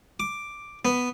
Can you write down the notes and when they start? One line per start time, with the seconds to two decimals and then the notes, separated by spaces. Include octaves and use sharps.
0.20 D6
0.85 B3